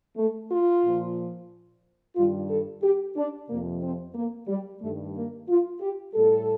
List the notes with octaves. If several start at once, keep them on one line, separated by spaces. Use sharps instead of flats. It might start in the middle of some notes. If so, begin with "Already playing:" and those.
A3
F4
A#2 F3
G2 D#3 G3 F4
A4
G4
D4
F2 C3 F3 A#3
C4
A#3
G3
G2 D#3 G3 A3
A#3
F4
G4
A2 G3 A4